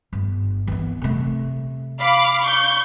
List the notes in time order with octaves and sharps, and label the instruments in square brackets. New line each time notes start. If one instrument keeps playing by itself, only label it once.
[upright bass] G1
E3 B3
C3 A3
[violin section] F5 B5 D6
C#6 G6